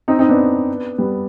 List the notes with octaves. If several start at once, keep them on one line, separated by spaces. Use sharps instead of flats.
C4 D#4
C4 D#4
B3 D4
G3 B3